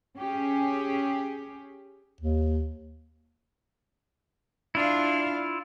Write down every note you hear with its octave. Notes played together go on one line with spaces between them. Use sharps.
C#4 G4 G#4
D#2
D4 E4 F4 F5